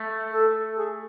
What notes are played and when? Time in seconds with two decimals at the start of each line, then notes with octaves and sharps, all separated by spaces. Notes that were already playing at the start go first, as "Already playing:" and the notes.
Already playing: A3
0.31 A4
0.76 G#4